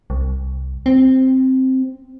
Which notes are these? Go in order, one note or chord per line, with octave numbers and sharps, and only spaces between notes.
C2
C4